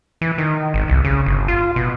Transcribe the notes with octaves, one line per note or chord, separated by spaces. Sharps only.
E3
D#3
G#1
C2
C#3
G1
F4
B2